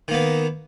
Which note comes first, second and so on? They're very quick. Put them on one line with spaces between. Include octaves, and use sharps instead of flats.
D#3 A#3 B3